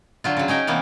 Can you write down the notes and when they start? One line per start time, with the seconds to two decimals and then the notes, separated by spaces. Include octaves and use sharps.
0.24 D3 F#3 F4
0.37 C#3 F#3
0.48 C#4 D#4 G5 G#5
0.67 C3 E3 A#3 B3 C#4